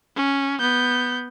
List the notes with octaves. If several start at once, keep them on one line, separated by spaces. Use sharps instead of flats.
C#4
B3 G6